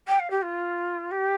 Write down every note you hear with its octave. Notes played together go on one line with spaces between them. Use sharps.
G5
F5
G4
F4
G4